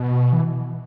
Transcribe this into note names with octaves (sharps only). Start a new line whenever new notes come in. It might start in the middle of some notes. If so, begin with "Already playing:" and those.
Already playing: B2
E3